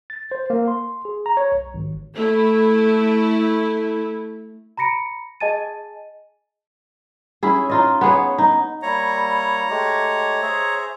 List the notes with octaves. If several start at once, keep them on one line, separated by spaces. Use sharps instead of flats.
A6
C5
A#3
C6
G#4
A#5
C#5
B1
G#1
A3 E4
A#5 B5 A#6 C#7 D7
G#4 D#5 G#5 A5 A6 D#7
C#4 E4 G#4
D#4 F4 D#5
B3 G#4 C#5
D#4
G3 A#3 E4 C#5 A#5
G#3 A3 G4
G#4 C5 E5